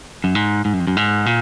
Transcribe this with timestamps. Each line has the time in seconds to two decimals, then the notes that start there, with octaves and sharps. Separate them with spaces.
0.24 F#2
0.35 G#2
0.65 G#2
0.73 F#2
0.80 F2
0.87 F#2
0.97 G#2
1.26 A#2